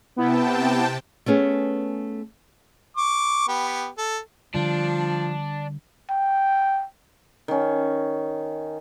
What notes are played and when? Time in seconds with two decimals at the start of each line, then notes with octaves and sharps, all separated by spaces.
0.16 C3 B3 E4 G5 A5
1.26 A3 B3 C#4 G#4
2.97 C#6 D6
3.48 B3 G4
3.98 A4
4.54 D3 F3 G3 D4
6.09 G5
7.48 D#3 C#4